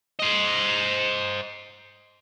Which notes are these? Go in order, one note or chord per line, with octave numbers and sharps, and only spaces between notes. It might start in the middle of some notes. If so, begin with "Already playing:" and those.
C5 D#5